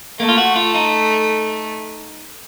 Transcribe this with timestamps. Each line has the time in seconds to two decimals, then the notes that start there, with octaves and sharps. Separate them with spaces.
0.20 A3 A#3
0.29 F4
0.38 F#4
0.56 F4
0.75 D#4